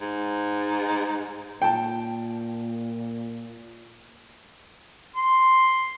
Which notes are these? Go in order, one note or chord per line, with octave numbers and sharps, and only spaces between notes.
G#2
A#2 G5 A5
C6